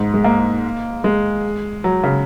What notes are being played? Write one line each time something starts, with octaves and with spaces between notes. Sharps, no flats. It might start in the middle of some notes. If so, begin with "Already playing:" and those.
Already playing: G#2
G#3
A#3
G#3
F#3
C#3